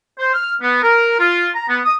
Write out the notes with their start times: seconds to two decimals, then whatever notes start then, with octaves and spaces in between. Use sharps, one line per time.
0.19 C5
0.34 F6
0.61 B3
0.82 A#4
1.19 F4
1.56 A#5
1.69 B3
1.85 D#6